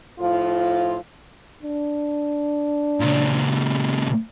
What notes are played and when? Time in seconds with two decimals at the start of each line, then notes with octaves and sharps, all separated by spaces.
0.19 A2 F3 F4
1.62 D4
3.00 A#2 C#3